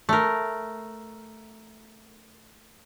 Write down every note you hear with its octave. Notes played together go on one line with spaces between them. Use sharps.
A3 A#4